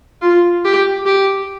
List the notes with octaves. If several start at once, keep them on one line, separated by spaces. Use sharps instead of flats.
F4
G4
G4